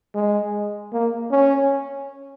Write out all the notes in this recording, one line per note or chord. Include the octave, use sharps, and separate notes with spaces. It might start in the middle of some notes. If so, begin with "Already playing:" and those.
G#3
A#3
C#4